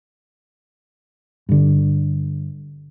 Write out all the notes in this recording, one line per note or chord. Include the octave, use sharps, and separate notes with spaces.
G2 D3